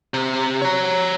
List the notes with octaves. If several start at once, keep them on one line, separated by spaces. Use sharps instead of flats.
C3
C#5 A#5